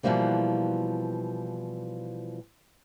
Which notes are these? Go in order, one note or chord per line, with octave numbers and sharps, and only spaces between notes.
B2 E3 F3 G3 A#3 C4